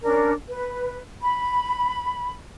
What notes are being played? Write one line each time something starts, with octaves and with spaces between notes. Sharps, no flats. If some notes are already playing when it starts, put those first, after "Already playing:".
C#4 D4 A#4
B4
B5